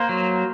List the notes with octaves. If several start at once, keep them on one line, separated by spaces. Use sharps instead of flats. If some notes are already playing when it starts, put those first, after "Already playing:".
Already playing: A#3 C5
F#3